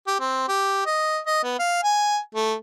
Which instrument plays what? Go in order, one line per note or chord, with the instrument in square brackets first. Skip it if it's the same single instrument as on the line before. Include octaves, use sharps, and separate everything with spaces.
[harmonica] G4
C4
G4
D#5
D#5
B3
F5
G#5
A3